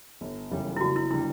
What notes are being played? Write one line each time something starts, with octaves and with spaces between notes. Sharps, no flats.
G1
F#2 C#3 E3 G3
E4
F#1 F#4
E4
D3 G3 E4